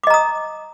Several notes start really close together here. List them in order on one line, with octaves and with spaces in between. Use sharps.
D6 D#5 A#5 D#6